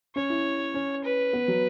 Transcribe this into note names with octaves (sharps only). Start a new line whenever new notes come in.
C#4 C#5
E4
C#4
B4
B3
F#3